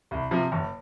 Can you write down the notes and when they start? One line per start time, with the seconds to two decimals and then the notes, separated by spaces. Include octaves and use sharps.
0.11 C2
0.31 C3 F3
0.52 F#1